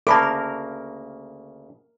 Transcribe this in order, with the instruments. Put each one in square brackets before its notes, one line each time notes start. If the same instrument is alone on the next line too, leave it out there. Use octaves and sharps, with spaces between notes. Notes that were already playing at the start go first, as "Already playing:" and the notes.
[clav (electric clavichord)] D2 C#3 A#3 [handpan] A#4 [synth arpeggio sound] A5 B5 D6